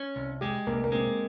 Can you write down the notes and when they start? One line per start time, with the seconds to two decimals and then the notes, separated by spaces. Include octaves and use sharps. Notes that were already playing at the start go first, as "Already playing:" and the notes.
Already playing: C#4
0.16 C2
0.41 G#3 G4
0.67 C2 A#3
0.84 A#3
0.92 G#3 C4